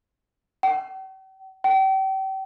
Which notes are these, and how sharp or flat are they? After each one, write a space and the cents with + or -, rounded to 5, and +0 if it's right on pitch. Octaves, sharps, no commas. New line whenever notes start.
G5 -45
G5 -35